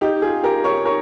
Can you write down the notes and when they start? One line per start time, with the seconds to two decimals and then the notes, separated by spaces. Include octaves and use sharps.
0.01 D#4 G4
0.22 F4 G#4
0.44 G4 A#4
0.64 A#4 C#5
0.85 A#4 C#5